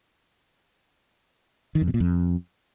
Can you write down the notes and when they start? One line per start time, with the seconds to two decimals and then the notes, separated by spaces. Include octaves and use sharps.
1.75 D#3
1.81 F2
1.88 B2
1.94 A#2
2.00 F2